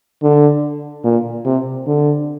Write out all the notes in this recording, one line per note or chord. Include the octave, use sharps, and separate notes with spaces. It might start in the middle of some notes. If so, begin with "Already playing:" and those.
D3
A#2
C3
D3